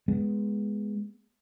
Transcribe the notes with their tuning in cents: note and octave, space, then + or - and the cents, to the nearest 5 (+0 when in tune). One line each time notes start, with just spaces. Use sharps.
G#3 +0 B3 +0